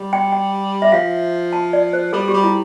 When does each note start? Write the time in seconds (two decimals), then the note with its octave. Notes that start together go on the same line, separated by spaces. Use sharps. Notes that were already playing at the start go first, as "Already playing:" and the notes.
Already playing: G3
0.13 G5
0.32 G5
0.82 E5
0.92 F3 F5
1.53 A5
1.73 D5
1.93 C5
2.13 G3 A4
2.28 G4
2.34 G3
2.44 E4